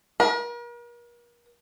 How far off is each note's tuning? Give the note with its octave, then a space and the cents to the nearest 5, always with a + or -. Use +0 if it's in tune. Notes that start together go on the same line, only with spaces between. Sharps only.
A#4 +40